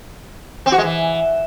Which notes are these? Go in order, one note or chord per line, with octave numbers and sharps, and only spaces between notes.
C4
F#4
G#3
E3